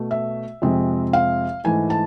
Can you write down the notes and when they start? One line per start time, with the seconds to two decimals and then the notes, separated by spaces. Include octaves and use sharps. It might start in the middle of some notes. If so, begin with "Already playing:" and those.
Already playing: B2 A3
0.11 E5
0.62 F2 C3 G#3 C4
1.13 F5
1.64 G#2 E3 A3 G#5
1.90 A5